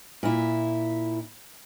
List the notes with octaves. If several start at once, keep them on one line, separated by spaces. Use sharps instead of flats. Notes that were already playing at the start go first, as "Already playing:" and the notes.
A#2 E4